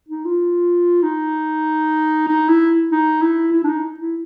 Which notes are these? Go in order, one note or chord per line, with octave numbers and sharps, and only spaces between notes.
D#4
F4
D#4
D#4
E4
D#4
E4
E4
D4
D#4
E4